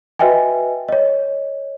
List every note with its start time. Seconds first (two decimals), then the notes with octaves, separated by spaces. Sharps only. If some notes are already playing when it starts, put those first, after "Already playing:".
0.19 F#4 B4 D#5 E5 G5 G#5
0.89 C#5 D#5